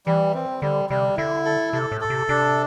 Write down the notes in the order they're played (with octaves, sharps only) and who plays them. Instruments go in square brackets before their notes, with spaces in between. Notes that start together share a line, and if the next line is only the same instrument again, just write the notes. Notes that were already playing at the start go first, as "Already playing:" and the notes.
[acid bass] E3 [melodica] G3
[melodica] C4
[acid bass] D3 [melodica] G3
[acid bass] C3 [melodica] G3
[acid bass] D3 [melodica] E4
[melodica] A4
[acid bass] C3 [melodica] A4
[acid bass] A2
[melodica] A4
[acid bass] C3
[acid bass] C3 [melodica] D4